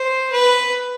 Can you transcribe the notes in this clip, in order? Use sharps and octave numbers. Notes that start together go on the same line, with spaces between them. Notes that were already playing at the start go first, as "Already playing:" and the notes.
Already playing: C5
B4